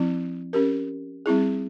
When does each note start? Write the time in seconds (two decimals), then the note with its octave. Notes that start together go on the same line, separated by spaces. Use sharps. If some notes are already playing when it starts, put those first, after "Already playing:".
Already playing: F3 C4 E4
0.53 C#4 G4 A#4
1.26 G3 C4 E4 G#4